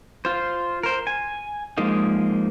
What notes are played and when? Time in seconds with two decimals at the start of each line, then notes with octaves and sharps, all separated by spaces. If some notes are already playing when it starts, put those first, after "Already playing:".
0.25 F4 C5
0.83 A#4 C5
1.07 G#5
1.78 F3 G#3 A#3 D#4